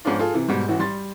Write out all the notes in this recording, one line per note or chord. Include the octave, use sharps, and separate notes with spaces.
G#2 F3 B3 C#4 D4 F4
F4 G#4 A4
C3 E3
G#2 B2 G3
A1 E3 F#4
G3 C6 A6